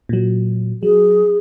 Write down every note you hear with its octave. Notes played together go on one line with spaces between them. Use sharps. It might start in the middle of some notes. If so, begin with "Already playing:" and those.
A#2 F#3
F#3 G#4